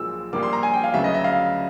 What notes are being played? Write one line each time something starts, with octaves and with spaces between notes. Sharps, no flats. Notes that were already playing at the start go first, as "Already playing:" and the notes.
Already playing: B1 A#2 F3 G#3 E6
A#1 A#2 G3 A#3 D6
C6
A#5
G#5
G5
F5
D2 C#3 F#3 B3 E5
D#5
E5
F5